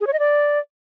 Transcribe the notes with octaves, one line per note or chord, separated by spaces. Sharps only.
G#4
C#5
D#5
D5